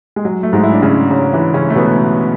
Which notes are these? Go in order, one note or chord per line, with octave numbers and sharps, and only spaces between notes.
G#3
F#3
A3
G#2 G#3
E4
D4
C#3 C#4
C#3 C#4
E3 E4
C#3 C#4
A3
B2 B3